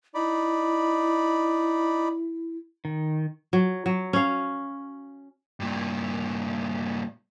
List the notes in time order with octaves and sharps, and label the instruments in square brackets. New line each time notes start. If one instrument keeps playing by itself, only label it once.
[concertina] D#4 D5 B5 [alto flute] E4
[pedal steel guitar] D#3
[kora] F#3
F#3
C#4 F5
[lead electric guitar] G2 A#2